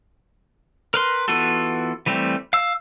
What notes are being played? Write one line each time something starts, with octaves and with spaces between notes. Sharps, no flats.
A#4 B4 C6
E3 B3 F4 F#4 A4
E3 G3 A3 C4
F5 E6